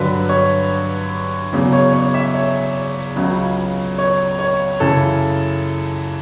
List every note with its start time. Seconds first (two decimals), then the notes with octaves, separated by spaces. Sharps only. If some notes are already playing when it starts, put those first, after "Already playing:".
Already playing: G2 D3 F#3 B4
0.29 C#5
1.53 E2 C#3 F#3
1.73 C#5
1.93 C#5
2.14 E5
2.34 C#5
3.16 C#2 C#3 F#3
3.98 C#5
4.39 C#5
4.80 F#2 C#3 E3 A4